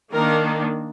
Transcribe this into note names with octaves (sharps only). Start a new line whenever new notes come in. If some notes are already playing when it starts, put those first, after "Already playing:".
D#3 A#3 D4 A#4